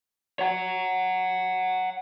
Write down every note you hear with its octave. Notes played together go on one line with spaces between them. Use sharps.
C#5 F#5